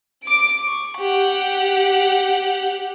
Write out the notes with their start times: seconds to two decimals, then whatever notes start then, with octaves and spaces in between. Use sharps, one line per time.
0.23 D6 D7
0.66 C#6
0.99 G4 F#5